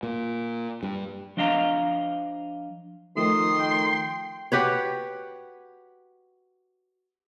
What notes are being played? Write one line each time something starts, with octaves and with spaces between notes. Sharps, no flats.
A#2
G2
F3 D4 D#5 F5 A#5
D#3 F3 A3 C6 D#6
G5
F#4 G4 B4 C#5